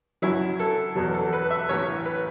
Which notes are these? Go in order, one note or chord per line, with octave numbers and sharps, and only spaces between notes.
F#2 F#3 E4
A4
E2 B2 F#3
A4
B4
E5
A1 A2 E3 C#5
B4